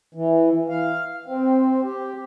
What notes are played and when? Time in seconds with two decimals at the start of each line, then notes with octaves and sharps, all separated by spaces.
0.14 E3
0.69 F5
1.26 C4
1.83 G4